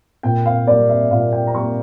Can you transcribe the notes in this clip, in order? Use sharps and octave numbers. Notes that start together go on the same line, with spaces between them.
A#2 G5
F5
G3 A#3 D5
E5
A#2 F5
G5
A#5
G3 A#3 C#6